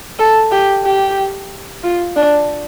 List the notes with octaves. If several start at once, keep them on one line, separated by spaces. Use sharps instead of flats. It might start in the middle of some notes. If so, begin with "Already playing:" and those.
A4
G4
G4
F4
D4